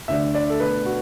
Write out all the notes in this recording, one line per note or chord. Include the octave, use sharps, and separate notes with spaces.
D2 D3 A3 D4 E5
D5
A4
B2 A3 D4 B4
F#4